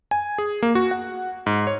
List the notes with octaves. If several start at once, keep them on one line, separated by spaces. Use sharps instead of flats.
G#5
G#4
A#3
F#4
F#5
G#2
C#5